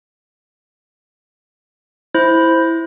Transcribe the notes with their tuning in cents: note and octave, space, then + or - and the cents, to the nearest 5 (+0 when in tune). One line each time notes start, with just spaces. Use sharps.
E4 +0 C5 +0